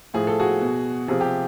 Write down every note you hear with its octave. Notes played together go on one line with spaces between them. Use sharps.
A2 F3 G#4
A4
F#4 G#4
B2
C3 F3 G#4
G4